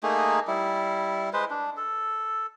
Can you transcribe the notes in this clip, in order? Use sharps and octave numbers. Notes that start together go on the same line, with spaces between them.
A3 A#3 D#4 G#4
G3 E4
G#3 B4 C5
D4
A4